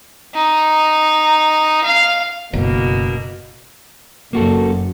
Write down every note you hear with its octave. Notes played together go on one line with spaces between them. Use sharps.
D#4
F5
F#1 B2 A#3
F#1 A#3 F#4 A4